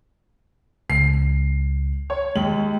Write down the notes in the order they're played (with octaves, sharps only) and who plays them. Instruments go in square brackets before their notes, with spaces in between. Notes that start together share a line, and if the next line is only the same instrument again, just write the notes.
[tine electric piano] C#2 [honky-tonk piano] C7
[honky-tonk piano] C#5
[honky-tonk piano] D#2 F#7 [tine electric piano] G#3